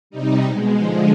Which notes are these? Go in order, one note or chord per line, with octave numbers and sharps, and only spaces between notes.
C3 G3 D#4
B2 G#3
D3 F3 G#3 D#4